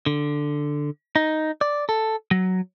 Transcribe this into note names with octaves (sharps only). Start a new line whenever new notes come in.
D3
D#4
D5
A4
F#3